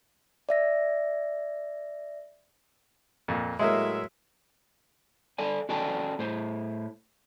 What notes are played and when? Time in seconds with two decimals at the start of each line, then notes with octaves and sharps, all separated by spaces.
0.49 D5 E5 A#6
3.28 F2 A#2
3.59 A2 F#3 G#3 A#3 E5
5.38 A4 D5 G#5
5.69 C#4 F#4 A4 D5 G5 A5
6.19 A2 C5